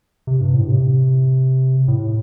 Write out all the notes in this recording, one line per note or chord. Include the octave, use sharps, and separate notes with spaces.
C3
G2
A2
C3
A2